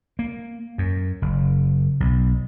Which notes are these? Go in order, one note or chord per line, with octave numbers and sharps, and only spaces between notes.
A#3
F#2
F#1
B1